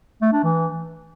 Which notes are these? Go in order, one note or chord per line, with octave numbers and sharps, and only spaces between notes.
A3
D4
E3